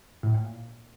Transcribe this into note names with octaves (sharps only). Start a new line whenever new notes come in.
A2
A#2